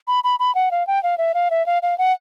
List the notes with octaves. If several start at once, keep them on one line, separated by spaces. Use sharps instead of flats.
B5
B5
B5
F#5
F5
G5
F5
E5
F5
E5
F5
F5
F#5